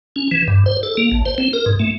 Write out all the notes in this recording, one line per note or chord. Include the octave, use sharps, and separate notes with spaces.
C#4
E3
G2
C5
A4
A#3
A1
C5
C4
A#4
G#2
A3